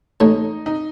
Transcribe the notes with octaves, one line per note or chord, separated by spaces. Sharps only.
A1 A2 A3 D#4
D#4